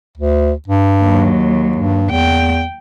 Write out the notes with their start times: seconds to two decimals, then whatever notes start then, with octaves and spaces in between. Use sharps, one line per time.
0.17 D2
0.68 G2
1.02 D#2 F#3
1.76 G2
2.11 E2 G5